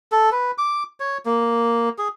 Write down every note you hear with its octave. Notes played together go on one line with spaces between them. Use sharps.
A4
B4
D6
C#5
A#3
G#4